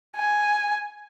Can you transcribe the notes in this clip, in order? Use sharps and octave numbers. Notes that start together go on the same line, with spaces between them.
G#5